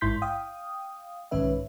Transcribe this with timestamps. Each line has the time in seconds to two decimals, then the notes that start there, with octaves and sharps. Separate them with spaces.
0.01 A1 G#2 E4 C6 G6 B6
0.22 F5 G5 D#6
1.31 B1 G#2 D#3 C#4 B4 E5